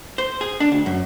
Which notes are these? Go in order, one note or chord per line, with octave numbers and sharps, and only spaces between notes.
C5
G#4
D4
D2
F#2